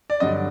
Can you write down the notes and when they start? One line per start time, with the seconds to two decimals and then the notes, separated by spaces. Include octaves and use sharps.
0.10 D5
0.20 G2 D3 F#3 D#5